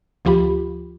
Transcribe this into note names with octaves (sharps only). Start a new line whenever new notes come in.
D2 F3 F4 G4 B5